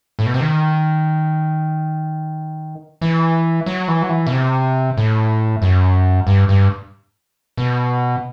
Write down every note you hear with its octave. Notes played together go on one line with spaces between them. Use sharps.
A2
B2
C3
D#3
E3
F#3
E3
F#3
E3
B2
C3
A2
F#2
G2
G2
B2